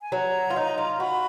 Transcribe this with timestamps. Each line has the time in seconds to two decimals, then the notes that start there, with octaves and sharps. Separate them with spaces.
0.02 G#5
0.12 F#3 A#5
0.50 F4
0.56 D#4
0.78 F4
1.00 F#4 B5